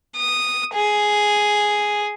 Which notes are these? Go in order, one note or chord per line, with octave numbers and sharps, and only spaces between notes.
D#6
G#4